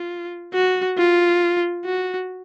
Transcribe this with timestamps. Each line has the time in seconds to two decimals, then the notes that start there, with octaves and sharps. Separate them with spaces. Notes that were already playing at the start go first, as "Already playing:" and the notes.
Already playing: F4
0.54 F#4
0.98 F4
1.85 F#4